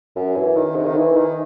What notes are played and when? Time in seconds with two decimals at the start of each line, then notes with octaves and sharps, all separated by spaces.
0.16 F#2
0.36 E3
0.56 D#3
0.76 C3
0.86 D#3
0.96 E3
1.16 D#3